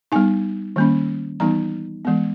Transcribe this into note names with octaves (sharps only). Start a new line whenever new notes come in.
G3 B3 D#4 G#5
D#3 G3 A#3 C#4
E3 G3 B3 D#4 A#5
E3 G#3 B3